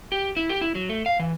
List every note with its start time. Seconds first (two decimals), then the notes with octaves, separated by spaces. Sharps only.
0.12 G4
0.37 E4
0.49 G4
0.61 E4
0.75 F#3
0.89 A3
1.06 F5
1.19 E3